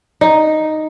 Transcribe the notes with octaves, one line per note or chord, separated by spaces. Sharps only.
D#4